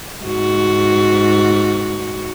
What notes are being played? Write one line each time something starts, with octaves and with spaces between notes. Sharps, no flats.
G#2 F#4